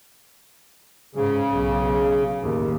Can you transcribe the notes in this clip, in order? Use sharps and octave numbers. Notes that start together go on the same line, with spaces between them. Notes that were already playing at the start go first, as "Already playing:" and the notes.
G#2 C#3
B1
D#2 A2